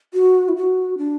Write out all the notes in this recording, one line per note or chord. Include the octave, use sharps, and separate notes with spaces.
F#4
E4
F#4
D4